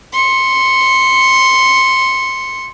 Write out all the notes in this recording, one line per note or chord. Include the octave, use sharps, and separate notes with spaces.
C6 C#7